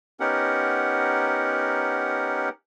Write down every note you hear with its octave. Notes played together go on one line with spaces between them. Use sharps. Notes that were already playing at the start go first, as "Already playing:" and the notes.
B3 C#4 D#4 G4 A#4 F#5